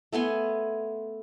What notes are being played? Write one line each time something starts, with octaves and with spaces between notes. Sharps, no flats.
A3 B3 G#5 C6